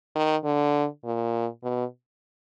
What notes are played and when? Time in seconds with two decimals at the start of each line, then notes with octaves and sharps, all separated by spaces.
0.16 D#3
0.44 D3
1.05 A#2
1.63 B2